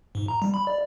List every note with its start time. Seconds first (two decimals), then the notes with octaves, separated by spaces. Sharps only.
0.15 G#2
0.28 A#5
0.42 G3
0.54 B5
0.67 D5